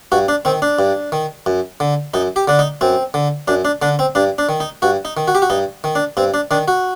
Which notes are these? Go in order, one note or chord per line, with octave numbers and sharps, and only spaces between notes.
G2 F#4
D4
D#3 C4
D4
G2
D#3
F#2
D3
F#2 D#4
G4
D3 D4
D#4
F#2 C4
D3
F#2 D4
D4
D3 D4
C4
G2 D4
D4
D#3
D#4
G2 F#4
D#4
D#3
F#4
G4
F#4
G2 D#4
D#3
D4
G2 C4
D4
D#3 D4
F#4